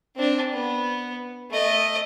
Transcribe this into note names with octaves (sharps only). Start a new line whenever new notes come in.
C4 D4
B3
A3 D#5